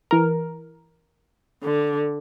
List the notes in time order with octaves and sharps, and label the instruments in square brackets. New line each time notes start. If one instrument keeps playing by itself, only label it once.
[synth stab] E3 A#4
[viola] D3